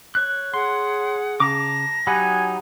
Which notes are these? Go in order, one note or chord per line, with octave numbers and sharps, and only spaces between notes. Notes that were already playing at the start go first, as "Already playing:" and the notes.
C#5 F#6
G#4 F#5 C6
C#3 A5 A#5 D6 A#6
F#3 D#4 G4 F#5 G#5 B5